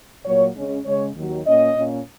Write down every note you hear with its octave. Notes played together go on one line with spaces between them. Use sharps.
A#2 F#3 A#3 C#5
C#3 G#3 C#4
C#3 G#3 C#4 C#5
D#2 D#3 F#3
A#2 A#3 C#4 D#5
A#2 A#3 C#4